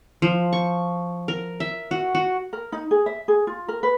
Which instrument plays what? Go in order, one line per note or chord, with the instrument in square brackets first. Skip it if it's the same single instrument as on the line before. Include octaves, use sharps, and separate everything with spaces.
[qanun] F3
C#6
A#4
E5
F#4
F#4
[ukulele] A#4
D#4
G#4
E5
G#4
F4
A#4
B4